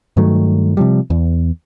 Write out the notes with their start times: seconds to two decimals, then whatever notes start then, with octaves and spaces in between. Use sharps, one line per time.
0.17 G2 D#3 F#3 A3
0.77 C3 F3 G3
1.10 E2